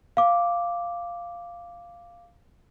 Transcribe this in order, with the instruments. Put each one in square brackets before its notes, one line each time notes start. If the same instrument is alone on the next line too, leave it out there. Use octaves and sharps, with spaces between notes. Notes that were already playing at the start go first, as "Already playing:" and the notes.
[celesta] F5 D6